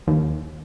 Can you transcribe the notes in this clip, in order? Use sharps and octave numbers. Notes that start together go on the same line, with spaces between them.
D#2